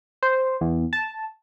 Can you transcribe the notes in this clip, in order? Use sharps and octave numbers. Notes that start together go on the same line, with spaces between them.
C5
E2
A5